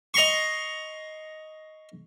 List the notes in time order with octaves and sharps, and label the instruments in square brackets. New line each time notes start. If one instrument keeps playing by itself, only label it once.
[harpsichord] D#5 A#5 C6 C#6